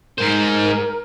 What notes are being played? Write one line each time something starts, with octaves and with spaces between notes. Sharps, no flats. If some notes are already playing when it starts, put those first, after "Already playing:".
G#2 A#4 C5